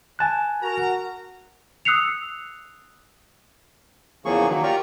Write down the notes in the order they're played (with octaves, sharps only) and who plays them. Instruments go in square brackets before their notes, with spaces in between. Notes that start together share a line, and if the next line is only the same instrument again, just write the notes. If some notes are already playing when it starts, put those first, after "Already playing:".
[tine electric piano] G#5 A5 F#6
[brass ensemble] F#4 A#4 A#5
[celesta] D#6 E6 F#6 C7 C#7 F7
[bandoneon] E2 C#3 F3 A#3 G#4 C#6
D#3 F#3 A#3
F4 G4 A#4 D5 A#5 C#6